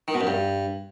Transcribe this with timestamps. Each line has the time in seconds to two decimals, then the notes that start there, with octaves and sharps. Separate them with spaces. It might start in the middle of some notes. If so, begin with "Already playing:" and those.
0.08 D#3
0.14 B2
0.21 F#2
0.27 G2